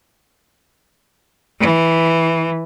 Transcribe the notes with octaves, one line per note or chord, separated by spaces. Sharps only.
E3